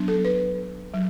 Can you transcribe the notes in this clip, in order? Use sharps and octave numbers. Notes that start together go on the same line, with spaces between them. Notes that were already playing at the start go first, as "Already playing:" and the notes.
Already playing: F#3 B3 D4
A4
B4
F#3